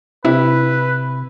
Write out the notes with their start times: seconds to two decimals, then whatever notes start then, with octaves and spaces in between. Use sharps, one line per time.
0.25 C3 E4 B4